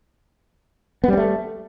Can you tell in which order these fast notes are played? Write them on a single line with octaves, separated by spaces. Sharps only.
B3 G3 C4 A3